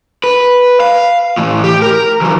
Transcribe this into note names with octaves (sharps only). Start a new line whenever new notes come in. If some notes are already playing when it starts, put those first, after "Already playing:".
B4
F5
A2 E3
G4
A#4
E3 F#3